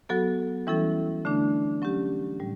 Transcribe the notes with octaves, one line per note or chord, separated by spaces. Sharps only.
F#3 B3 F#4 A4
E3 G3 C#4 E4 A4
D3 A3 D4
F#3 C#4 G4
A2 G3